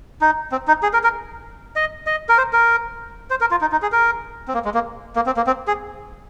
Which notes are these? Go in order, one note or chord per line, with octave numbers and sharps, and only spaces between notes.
D#4
C4
D#4
G#4
A#4
A#4
D#5
D#5
A#4
C5
A#4
C5
A#4
F4
D#4
D#4
G#4
A#4
C4
A#3
G#3
A#3
A#3
C4
A#3
C4
G#4